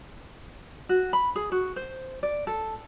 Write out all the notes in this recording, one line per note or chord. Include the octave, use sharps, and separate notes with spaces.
F#4
B5
G#4
F#4
C5
D5
A4